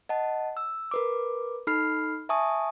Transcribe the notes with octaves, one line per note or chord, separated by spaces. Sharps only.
D#5 F#5 A5
E6
A#4 B4 D6
D#4 A4 B5 F6 C7
E5 G#5 A5 C#6 D#6